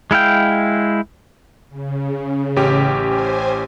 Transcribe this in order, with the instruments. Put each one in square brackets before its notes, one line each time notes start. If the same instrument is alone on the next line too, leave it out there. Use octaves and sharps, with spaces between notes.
[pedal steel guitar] G#3 E4 F5 G5
[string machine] C#3
[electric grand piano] A1 C#4 G4
[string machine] C5 G#5